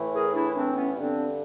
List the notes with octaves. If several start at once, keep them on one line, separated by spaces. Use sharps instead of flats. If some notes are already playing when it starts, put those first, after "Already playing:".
Already playing: A2 E3
G#4 A#4
D4 E4
C4 D4
B3 C#4
G2 D3 C4 D4